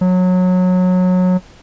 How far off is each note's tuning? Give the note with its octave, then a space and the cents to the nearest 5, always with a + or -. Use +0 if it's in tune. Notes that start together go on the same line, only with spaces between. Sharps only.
F#3 -20